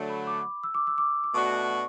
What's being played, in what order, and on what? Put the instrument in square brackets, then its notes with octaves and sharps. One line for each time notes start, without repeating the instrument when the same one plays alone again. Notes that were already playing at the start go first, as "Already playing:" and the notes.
Already playing: [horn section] D3 F#3 A3
[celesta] B5
D6
E6
D6
E6
D6
D6
[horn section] B2 A3 D4 F#4 [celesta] C#6
[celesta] C#6